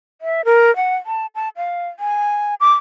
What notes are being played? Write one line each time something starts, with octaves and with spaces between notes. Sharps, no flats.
E5
A#4
F#5
A5
A5
F5
G#5
D6